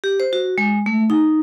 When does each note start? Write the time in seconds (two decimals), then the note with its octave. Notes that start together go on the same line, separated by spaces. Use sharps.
0.04 G4
0.20 C5
0.33 F#4
0.58 G#3
0.86 A3
1.10 D#4